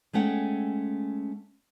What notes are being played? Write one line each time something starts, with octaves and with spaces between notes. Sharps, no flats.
G#3 A3 C#4 F#5 G5